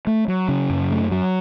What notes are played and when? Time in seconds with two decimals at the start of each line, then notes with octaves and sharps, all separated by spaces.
0.07 A3
0.28 F#3
0.48 C#3
0.70 F#2
0.91 A3
1.11 F#3